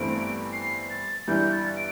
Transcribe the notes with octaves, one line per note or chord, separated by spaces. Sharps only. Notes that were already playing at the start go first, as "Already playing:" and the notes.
Already playing: G1 G2 E3 A3 C4 D7
C7
A6
G1 G2 E3 G3 E4 G6
A6
D7